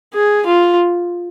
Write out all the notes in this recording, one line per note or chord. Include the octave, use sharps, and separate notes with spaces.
G#4
F4